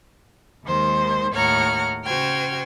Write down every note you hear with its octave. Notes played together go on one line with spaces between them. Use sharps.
D#2 D#3 G#3 C5
D#2 A2 C#5 F#5 A#5 F6
C#3 F#4 C5 G5 F6 G#6